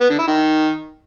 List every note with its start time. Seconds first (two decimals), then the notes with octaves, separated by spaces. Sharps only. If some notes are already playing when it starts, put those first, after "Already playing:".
0.01 B3
0.10 D3
0.19 E4
0.28 D#3